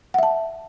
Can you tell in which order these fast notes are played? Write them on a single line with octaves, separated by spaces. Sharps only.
F#5 E5 A5